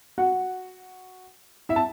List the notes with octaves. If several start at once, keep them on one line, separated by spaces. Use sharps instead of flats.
F#4 F#5
E4 E5
A5